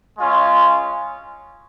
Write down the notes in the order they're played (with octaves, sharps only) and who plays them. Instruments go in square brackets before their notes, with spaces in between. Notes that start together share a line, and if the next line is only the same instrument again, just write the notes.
[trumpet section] G#3 C#4 F4